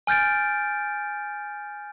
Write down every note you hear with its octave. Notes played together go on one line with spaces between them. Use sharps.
G#5 F6 G6 A6 D7